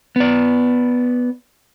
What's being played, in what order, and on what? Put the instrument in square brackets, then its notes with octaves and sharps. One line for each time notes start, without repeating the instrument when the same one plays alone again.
[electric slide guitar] B3 D5